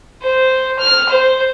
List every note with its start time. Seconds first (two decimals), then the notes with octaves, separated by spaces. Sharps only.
0.22 C5
0.79 F6
1.09 C5